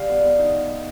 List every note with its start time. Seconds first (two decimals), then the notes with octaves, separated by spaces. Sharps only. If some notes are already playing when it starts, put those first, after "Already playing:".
Already playing: G3 F5
0.09 B3
0.23 B3
0.39 D#4